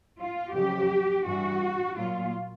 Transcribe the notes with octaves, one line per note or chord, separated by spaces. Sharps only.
F4
F2 C#3 F#3 G4
G2 E3 G3 F#4
A#2 F#3 F4